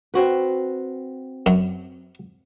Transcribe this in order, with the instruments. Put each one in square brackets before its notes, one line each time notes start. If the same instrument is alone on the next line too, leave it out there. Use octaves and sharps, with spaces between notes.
[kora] C4 F#4 B4
[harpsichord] F#2